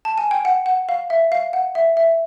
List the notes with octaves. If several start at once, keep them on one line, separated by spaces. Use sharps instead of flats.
A5
G#5
G5
F#5
F#5
F5
E5
F5
F#5
E5
E5